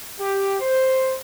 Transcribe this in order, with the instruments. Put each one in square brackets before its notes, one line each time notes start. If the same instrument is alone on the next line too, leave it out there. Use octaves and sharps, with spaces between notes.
[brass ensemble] G4
C5